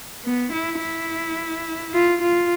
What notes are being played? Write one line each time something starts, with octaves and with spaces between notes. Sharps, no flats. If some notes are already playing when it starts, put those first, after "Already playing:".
B3
E4
E4
F4
F4